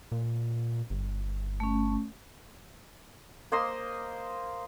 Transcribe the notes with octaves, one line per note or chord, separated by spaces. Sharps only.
A#2
G1
A3 C#4
A#3 C5 D#5 C6